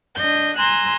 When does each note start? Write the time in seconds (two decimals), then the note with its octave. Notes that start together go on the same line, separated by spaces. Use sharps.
0.16 D4 D#5 G6
0.57 G#5 A#5 C6 E6 F#6